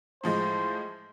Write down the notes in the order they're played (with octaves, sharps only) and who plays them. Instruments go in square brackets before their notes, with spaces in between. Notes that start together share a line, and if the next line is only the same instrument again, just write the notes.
[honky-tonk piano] A2 F3 G#3 [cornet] C5